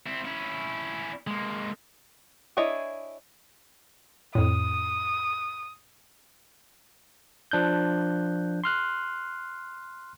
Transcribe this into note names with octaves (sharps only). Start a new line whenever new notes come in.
C4 E4
C#4 E4
G#3 A#3
D4 E4 G#4 C#5 D#5
F2 A2 D#6
F3 D4 F#6 G6
C6 F6 F#6